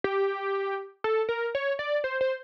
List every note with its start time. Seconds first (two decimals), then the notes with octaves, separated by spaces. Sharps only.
0.04 G4
1.04 A4
1.29 A#4
1.55 C#5
1.79 D5
2.04 C5
2.21 C5